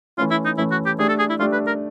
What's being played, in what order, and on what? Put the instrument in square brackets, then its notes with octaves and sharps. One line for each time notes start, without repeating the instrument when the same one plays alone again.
[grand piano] E3 A3 C#4 [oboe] F4
[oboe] E4
D#4
[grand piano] E3 A3 C#4 [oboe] E4
[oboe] F#4
G4
[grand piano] A3 D4 G4 [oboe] G#4
[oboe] A4
G#4
E4
[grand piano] A3 D4 G4 [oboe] F4
[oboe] B4
A#4